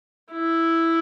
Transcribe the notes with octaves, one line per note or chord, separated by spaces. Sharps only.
E4